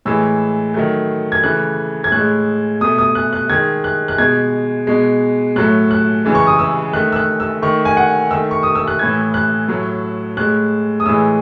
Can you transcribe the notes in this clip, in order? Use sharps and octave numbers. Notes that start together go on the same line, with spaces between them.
A2 E3 G#3 E6
D#3 F#3 A3
G#6
C#3 E3 A3 F#6
G#6
A2 G#3 F#6
B2 A3 D#6
D#6
F#6
F#6
D#3 G#3 G#6
F#6
F#6
B2 G#3 G#6
B2 G#3
A2 F#3 A3 F#6
F#6
C#3 E3 G#3
C#6
D#6
E6
D#3 A3 F#6
E6
F#6
E6
D#3 A3 C#6
G#5
F#5
D#3 A3 E6
C#6
D#6
E6
F#6
A2 E3 A3 G#6
F#6
A2 F#3 A3
A2 G#3 F#6
D#6
A2 E3 G#3 E6